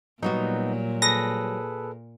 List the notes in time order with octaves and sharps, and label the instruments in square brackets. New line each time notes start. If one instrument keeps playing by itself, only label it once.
[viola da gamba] A#2 [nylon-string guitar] F#3 G3 F#4 [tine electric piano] B3 D#4
[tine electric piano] G#4 A4 B4 [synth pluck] A#6